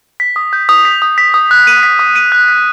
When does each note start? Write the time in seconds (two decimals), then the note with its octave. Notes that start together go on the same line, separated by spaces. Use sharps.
0.20 B6
0.36 D#6
0.53 G6
0.69 D#6
0.85 B6
1.02 D#6
1.18 B6
1.34 D#6
1.51 F#6
1.67 D#7
1.83 B6
1.99 D#6
2.16 D#7
2.32 F#6
2.48 B6